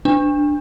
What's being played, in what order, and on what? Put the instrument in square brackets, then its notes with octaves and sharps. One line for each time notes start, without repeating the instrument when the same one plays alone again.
[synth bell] D4